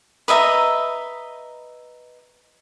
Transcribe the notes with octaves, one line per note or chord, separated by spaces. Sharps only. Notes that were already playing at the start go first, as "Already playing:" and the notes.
B4 D#5 E5 A#5